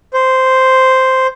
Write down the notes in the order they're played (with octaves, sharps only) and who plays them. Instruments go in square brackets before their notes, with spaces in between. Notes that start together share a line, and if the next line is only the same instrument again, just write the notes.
[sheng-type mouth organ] C5